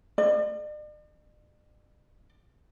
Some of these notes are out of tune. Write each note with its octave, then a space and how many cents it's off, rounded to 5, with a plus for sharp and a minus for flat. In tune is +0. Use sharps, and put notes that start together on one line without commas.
D5 +45